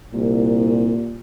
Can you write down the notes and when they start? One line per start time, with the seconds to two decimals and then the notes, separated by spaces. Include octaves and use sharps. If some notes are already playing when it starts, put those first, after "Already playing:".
0.14 C2 A#2